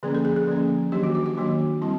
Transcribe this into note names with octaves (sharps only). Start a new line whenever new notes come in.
D3 F3 A#3 C#4 G#4
A4
G#4
G#4
D3 F3 A#3 C#4
D#3 F#3 A#3 D4 G4
F#4
F#4
F#4
D#3 F#3 A#3 D4
G3 C4 E4